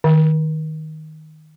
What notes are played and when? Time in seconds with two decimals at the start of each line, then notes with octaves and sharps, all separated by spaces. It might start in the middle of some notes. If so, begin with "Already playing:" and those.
0.04 D#3